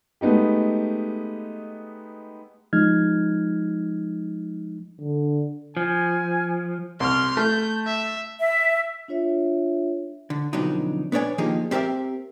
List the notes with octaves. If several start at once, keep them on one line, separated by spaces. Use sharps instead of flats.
G#3 A3 B3 D#4 G4
F3 G#3 D#4 F6 G#6
D3
F3 G#5
C2 C6 F6
A3 G6
E5
E5
D4 F4 C#5 E5
D3
F2 B2 D3 F#3 D4 D#4
B3 D4 C#5 D5 G#5
D#3 F3 A#3 D#4 G4 G#4
C4 G4 A#4 D5 E5